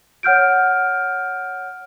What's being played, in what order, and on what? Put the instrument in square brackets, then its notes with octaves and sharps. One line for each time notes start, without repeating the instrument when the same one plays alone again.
[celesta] C#5 F#5 F6 G6 D7